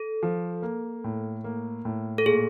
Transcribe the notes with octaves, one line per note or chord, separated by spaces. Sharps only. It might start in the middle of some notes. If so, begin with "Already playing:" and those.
Already playing: A4
F3
A#3
A2
A#3
A2
A4
A#2 G#4